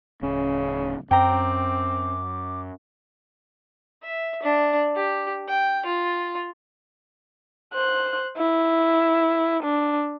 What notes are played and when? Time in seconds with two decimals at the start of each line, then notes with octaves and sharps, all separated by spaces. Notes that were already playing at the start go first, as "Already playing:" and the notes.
0.22 D1 C#3 C#4
1.11 F#2 C4 G5 A#5 D6
4.03 E5
4.43 D4
4.96 G4
5.48 G5
5.86 F4
7.73 C5 F#6
8.37 E4
9.63 D4